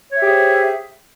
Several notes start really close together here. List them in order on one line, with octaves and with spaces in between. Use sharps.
C#5 E5 G4 G#4 C5